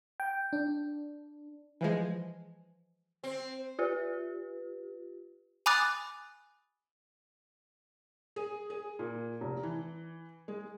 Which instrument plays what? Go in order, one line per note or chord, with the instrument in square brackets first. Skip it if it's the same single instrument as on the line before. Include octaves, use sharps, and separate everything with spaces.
[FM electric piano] G5
D4
[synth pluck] E3 F3 G#3
[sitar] C4
[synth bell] F4 G4 B4
[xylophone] G#5 B5 D6 D#6 F#6 A6
[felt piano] G#4
G#4
A#2
F1
E3
G#3